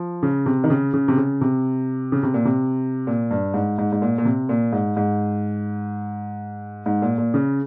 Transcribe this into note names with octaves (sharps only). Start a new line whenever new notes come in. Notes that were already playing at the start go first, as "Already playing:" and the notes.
Already playing: F3
C#3
C3
D#3
C#3
C#3
C3
C#3
C3
C#3
C3
A#2
C3
A#2
G2
G#2
G#2
G#2
A#2
A#2
C3
A#2
G#2
G#2
G#2
A#2
A#2
C#3